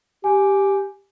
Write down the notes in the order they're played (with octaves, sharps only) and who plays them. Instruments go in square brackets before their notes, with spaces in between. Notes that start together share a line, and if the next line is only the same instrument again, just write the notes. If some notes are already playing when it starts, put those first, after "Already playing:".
[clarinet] G4 [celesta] G#5